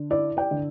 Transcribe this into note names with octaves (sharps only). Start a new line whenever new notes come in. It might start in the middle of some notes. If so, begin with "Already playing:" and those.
Already playing: D3
E4 D5
D5 G5
D3